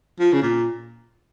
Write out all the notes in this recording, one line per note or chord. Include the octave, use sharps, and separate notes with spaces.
F3
C#3
A#2